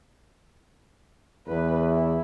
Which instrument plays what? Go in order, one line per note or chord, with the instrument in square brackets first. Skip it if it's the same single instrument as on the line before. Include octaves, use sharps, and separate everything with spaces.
[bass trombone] E2 [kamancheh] B4
[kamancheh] E4